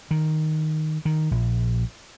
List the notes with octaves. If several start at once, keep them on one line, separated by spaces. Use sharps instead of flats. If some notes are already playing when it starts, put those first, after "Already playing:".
D#3
D#3
A#1